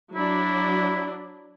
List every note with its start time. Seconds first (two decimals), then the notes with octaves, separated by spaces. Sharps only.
0.15 F#3 D4 E4